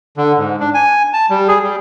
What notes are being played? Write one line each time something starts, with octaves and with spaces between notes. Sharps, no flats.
D3
G#2
D4
G#5
A5
G3
G#4
G3